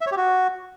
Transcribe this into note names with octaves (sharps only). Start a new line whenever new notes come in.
E5
C#5
G4
F#4